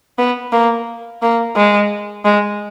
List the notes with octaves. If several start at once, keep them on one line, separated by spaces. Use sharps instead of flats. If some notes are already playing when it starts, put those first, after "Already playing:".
B3
A#3
A#3
G#3
G#3